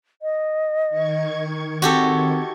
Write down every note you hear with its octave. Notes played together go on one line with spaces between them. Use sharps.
D#5
D#3 C#6 G#6
C4 F#4 G4 A4